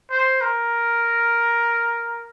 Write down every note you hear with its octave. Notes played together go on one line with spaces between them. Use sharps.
C5
A#4